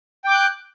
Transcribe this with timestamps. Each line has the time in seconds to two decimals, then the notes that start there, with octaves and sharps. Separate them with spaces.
0.24 G5
0.28 D6
0.31 G6
0.34 F#6